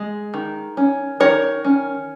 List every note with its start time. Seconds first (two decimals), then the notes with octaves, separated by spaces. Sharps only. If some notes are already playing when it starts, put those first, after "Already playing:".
Already playing: G#3
0.34 D#3
0.77 C#4
1.20 D#3 A#4 C#5
1.64 C#4